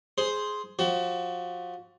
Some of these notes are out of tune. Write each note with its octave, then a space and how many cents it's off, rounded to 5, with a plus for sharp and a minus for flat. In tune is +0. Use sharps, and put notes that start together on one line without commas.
G#4 +10 C5 +0
F3 +30 F#4 +35